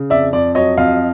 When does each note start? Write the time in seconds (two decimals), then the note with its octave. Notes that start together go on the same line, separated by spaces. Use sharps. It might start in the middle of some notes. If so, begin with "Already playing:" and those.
Already playing: C#3
0.10 F2 D5 E5
0.33 F2 D5
0.55 F#3 C#5 D#5
0.77 F2 D#5 F5